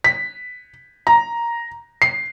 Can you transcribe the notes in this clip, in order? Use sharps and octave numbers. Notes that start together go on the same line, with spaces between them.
B6
A#5
C7